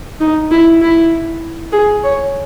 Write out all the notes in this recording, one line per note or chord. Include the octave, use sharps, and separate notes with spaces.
D#4
E4
E4
G#4
C#5